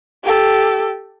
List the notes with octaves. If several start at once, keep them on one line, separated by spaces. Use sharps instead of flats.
G4 A4